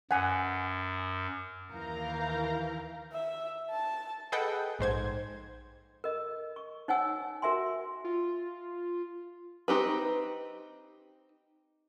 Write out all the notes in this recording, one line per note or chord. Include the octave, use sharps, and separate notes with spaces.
F#2 F#5 G#5
D#2 E3 A#4 F5 A#5 G6
E5
A5
G#4 A4 B4 D#5 F#5 G5
A#1 G#2 C5 G#6
A#4 D#5
C#6
D#4 C#5 F#5 G#5 E6
F#4 A#4 E5 G#5 C6
F4
C4 D#4 G4 B4